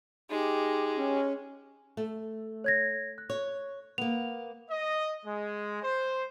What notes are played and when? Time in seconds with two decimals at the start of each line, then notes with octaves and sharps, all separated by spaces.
0.30 G#3 D#4 G4
0.97 C#4
1.97 A3
2.64 C#5 G#6 A#6
3.18 F#6
3.30 C#5
3.98 A#3 B3 F7
4.70 D#5
5.26 G#3
5.82 C5